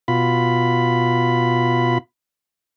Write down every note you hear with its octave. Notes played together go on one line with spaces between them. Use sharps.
B2 F4 B5